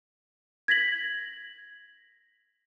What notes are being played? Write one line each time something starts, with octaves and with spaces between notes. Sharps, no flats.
G#6 A#6 B6 F#7